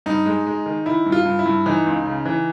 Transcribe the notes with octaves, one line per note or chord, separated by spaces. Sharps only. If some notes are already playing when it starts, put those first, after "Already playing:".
G2 D#4
G#3
G#3
D#3
D#3 E4
G2
F4
G2
E4
G2
E3 D#4
C#2
C#3
E3